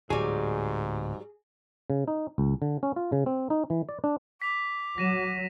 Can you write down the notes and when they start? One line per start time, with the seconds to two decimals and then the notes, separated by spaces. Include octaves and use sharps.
0.10 D1 G#2 F#3 G3 G#4
1.90 C#3
2.08 D#4
2.38 C#2
2.62 D3
2.83 C#4
2.96 F4
3.12 C#3
3.26 C4
3.50 D#4
3.70 E3
3.89 D5
4.04 D4
4.42 D6 B6 F7
4.98 F#3 A#6 D#7 E7